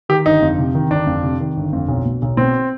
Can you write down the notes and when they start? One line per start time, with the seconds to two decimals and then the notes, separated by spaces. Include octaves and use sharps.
0.09 D#3 G4
0.26 G1 D#4
0.42 F2
0.58 C3
0.75 D#3
0.90 G1 D4
1.07 F2
1.23 C3
1.40 D#3
1.57 G1
1.73 F2
1.89 B1
2.05 B2
2.22 B1
2.37 B2 C4